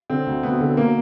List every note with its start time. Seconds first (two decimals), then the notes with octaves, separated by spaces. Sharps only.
0.10 D3 C4
0.27 D2
0.43 D2 B3
0.60 D3
0.77 B2 A#3